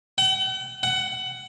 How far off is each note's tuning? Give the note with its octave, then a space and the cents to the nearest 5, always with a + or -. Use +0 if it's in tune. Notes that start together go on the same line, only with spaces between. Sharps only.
F#5 +45
F#5 +20